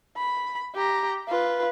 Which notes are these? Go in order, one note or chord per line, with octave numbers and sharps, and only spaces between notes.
B5
G4 A#5
F4 B4